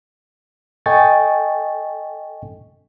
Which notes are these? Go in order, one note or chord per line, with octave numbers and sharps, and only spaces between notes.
A4 D#5 G5 G#5 C#6 A6